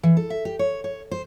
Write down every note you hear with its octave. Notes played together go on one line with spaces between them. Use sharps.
E3
A4
E5
G4
C#5
C#5
C5